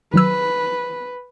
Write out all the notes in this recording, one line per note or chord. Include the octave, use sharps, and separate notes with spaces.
D#3 F#3 B4 E6